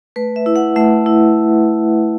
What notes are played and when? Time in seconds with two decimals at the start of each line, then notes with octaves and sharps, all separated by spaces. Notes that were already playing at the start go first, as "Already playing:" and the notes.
0.16 A3 B4
0.36 E5
0.46 E4
0.56 F#5
0.76 A3 E5
1.06 E4